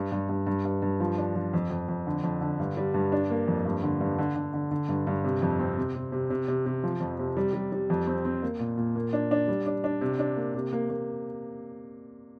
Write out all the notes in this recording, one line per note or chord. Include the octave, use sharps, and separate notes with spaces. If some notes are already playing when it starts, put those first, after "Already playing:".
Already playing: G2
G2
G2
G2
G2
G2
F3
D4
F3
F2
F2
F2
D3
F2
D3
G2
G3
G2
D4
A#3
F2
G2
D3
G2
D3
D3
D3
D3
G2
G2
C3
F2
C4
C3
C3
C3
C3
C3
C3
F3
F2
C3
G3
G3
G3
F2
C4
C4
A#3
A#2
A#2
A#3
D4
D4
G3
D4
D4
C3
D4
A#3
C3
A#3
A#3